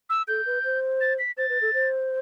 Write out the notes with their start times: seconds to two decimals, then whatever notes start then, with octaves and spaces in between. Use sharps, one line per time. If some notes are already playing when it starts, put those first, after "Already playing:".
0.10 E6
0.28 A4 G6
0.46 B4
0.64 C5
1.01 A6
1.19 B6
1.37 C5 A6
1.49 B4
1.62 A4
1.74 C5